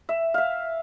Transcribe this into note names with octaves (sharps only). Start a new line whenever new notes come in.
E5
E5 F5